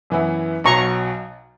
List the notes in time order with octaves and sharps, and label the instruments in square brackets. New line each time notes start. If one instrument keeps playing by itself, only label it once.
[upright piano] F#2 E3 B3 E4
[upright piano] B1 B2 F#3 [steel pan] A#5 C#6